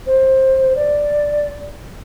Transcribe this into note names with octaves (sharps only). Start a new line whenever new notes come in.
C5
D5